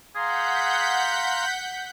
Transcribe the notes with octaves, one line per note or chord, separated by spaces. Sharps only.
G#4 F5 F#5 A#5 C6 G6 B6